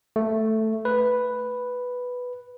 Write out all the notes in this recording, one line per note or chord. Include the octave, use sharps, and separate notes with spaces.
A3
B4